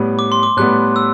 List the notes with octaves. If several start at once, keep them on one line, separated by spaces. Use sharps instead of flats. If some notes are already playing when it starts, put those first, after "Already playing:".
Already playing: A2 G3 B3
D6
C6
D6
A2 G3 B3 F#6
E6